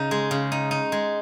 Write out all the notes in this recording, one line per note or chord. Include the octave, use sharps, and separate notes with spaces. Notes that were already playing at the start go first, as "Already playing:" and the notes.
Already playing: C#3 D#4
G#3
C#3
D#4
D#4
G#3